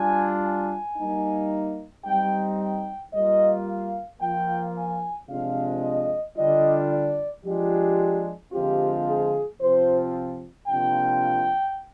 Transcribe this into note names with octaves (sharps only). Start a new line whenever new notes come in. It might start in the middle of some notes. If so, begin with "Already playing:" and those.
Already playing: G3 D4 F4 G#5
G#5
G3 A#3 D#4
G3 C4 D#4 G5
G5
G3 A#3 F4 D#5
F5
F3 A#3 F4 G5
G#5
C3 F3 G#3 D4 F4 F5
D#5
D3 G3 D4 F4 D#5
D5
F3 G#3 D4 F4 G4
D3 F3 G#3 C4 F4 G4
G#4
C3 F3 C4 F4 C5
C3 F3 A#3 D4 F4 G5